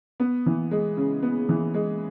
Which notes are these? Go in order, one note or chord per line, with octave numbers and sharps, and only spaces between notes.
B3
E3
G#3
C#3
B3
E3
G#3